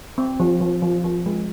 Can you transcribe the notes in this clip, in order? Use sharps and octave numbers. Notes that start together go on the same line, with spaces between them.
C4
F3
F3
F3
F3
G#3